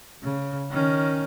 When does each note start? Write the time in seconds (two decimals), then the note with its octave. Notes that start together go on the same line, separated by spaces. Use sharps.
0.23 C#3
0.70 D#3 C#4